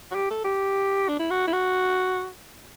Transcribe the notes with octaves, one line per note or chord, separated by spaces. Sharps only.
F#4
G4
A4
G4
D4
E4
F#4
E4
F#4